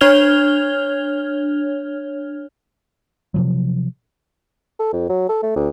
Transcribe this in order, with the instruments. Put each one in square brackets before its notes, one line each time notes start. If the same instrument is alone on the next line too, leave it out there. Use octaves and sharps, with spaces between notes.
[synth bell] D4 C#5 F6 G#6 F7 G7
[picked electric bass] C3 F3 F#3
[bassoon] A4
F2
F#3
A4
A3
D2